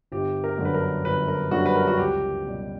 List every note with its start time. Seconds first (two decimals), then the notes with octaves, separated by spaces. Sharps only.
0.12 G1 G4
0.44 A#4
0.58 F#2 D3 G3
0.65 B4
0.74 A#4
1.05 G1 B4
1.28 A#4
1.51 F#2 D3 G3 F#4
1.66 B4
1.75 A#4
1.87 F#4
1.98 C#2 G4
2.45 B2 G3